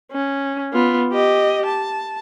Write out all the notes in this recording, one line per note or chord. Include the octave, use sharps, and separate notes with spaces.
C#4
B3 F4
G4 D#5
A5